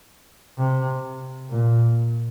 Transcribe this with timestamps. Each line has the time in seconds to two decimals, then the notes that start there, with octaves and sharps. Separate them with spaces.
0.59 C3
1.49 A#2